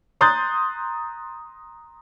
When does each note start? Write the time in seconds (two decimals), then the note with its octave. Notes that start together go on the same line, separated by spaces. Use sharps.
0.21 A#5 C6 D#6 F#6 G6 A6